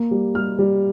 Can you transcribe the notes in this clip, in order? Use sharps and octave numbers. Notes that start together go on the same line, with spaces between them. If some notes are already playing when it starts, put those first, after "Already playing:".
Already playing: A#3
G3
G3 F6
G3